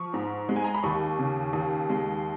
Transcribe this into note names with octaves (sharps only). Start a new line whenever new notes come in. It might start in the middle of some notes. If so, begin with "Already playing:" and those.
Already playing: F3 C#6
G#2
G#3
G#5
A#5
B5
D#2 C#6
C#3
D#2
G#3